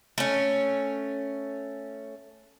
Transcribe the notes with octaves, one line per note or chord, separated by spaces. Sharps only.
A3 C#4